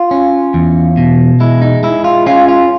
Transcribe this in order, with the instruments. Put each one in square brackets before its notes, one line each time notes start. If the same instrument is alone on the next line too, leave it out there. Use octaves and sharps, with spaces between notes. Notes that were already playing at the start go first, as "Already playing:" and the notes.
Already playing: [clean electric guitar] F4
C#4
E2
B2
G#3 E4
D#4
G#3 E4
F4
C#4 F4
F4